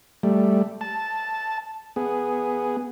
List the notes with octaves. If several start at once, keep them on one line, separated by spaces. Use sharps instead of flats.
G3 A3
A5
B3 G#4